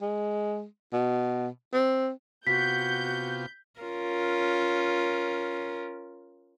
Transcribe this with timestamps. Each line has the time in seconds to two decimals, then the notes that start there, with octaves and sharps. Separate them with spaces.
0.01 G#3
0.93 B2
1.74 C4
2.47 C3 B3 F4 F#4 G6 B6
3.80 C#4 F4 A#4